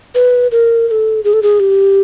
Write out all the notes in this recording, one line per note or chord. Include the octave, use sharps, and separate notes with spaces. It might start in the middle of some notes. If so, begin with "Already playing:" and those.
B4
A#4
A#4
A4
G#4
A4
G#4
G4